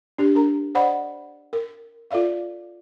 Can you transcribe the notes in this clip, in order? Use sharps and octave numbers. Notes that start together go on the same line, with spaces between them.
D4 G4
D4 A#4 A#5
C5 D5 D#5 F#5 B5
A#4
F4 A4 D5 E5 F5